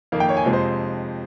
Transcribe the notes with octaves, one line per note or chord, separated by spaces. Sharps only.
F2 D#3 A#3
G5
C#5
G#5
F2 C3 F3 G#3
C5